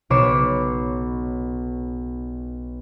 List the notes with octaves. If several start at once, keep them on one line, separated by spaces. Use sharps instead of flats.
B1 B4 C#5 D6 C7 E7